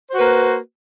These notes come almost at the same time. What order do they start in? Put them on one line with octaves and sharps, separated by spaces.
C5 F#4 B4 A#3